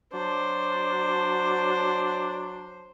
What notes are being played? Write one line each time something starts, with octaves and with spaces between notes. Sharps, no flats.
F#3 D4 C5